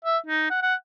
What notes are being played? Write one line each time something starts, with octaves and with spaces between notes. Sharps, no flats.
E5
D#4
F#5
F#5